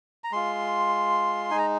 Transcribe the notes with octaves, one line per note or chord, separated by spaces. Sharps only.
A#5
G#3 F4 C6
G#3 D#4 G#5 A#5